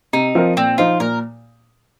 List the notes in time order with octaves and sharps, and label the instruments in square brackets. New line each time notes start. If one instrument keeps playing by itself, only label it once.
[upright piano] C3 [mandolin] D#4
[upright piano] F3 C4 F4 A#4
[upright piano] A#2 [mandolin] C4
[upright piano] F3 D#4 C5 [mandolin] F4
[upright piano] A#2 [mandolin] A#4